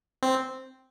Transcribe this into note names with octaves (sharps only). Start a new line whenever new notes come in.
C4